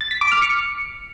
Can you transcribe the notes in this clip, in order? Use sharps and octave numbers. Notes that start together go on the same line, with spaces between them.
A6
B6
D6
F6
C#7